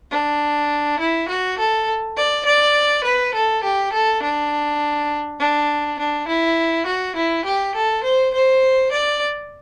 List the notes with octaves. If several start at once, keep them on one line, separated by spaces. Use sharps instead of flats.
D4
E4
F#4
A4
D5
D5
B4
A4
G4
A4
D4
D4
D4
E4
F#4
E4
G4
A4
C5
C5
D5